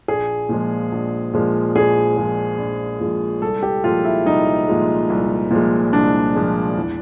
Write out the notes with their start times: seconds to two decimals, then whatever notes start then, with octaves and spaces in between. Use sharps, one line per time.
0.08 A#1 G#4
0.49 A#2 F3 G#3
0.92 A#1
1.34 A#2 F3 G#3
1.75 A#1 G#4
2.17 A#2 F3 G#3
2.58 A#1
3.00 A#2 F3 G#3
3.42 C2 A4
3.63 G4
3.84 A#2 F3 G#3 F4
4.05 E4
4.25 C2 D#4
4.68 A#2 F3 G#3
5.10 C2
5.51 A#2 F3 G#3
5.93 C2 D4
6.35 A#2 F3 G#3
6.77 E2